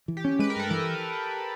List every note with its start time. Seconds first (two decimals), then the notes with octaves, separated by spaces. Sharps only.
0.08 E3
0.17 G4
0.25 C#4
0.39 G#3 B4
0.50 A#4
0.56 G2 A4
0.70 E3 A#4